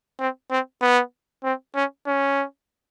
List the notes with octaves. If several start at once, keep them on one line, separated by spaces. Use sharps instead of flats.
C4
C4
B3
C4
C#4
C#4